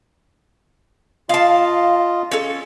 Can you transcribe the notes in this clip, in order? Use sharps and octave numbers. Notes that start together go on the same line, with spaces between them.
F4 D#5 F5 A5
C#4 A4